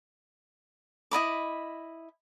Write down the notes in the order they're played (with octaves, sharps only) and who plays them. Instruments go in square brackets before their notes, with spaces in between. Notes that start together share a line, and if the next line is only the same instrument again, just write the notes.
[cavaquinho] E4 D#5 B5 D6